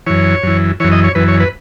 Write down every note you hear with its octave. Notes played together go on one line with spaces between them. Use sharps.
F#2 E3 C#5
F#2 E3
F#2 E3 C#5
D#5
C#5
F#2 E3 B4
C#5
B4